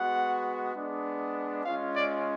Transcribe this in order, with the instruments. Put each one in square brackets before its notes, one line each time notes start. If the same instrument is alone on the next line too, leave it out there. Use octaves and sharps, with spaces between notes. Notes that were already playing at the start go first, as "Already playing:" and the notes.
Already playing: [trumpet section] G#3 B3 F#4 F#5
G#3 B3 D4
G#3 C#4 F4 F5
D5